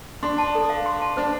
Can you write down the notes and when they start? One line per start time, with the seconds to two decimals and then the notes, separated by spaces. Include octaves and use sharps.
0.23 D4 C6
0.38 A5
0.55 A4
0.70 F5
0.86 C6
1.01 A5
1.17 D4 C5